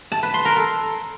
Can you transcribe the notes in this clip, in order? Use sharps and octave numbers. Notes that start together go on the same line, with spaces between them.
A5
B4
C6
A#4
A4